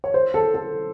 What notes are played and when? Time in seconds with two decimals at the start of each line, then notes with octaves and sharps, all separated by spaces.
0.04 C#5
0.14 C5
0.34 A4
0.54 A4